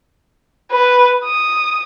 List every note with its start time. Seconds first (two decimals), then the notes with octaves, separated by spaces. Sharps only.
0.71 B4
1.25 D#6